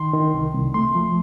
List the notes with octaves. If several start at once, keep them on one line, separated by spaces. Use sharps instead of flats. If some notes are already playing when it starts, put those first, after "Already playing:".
Already playing: D#3 C6
D#3
C2
C2
A3 C6
F3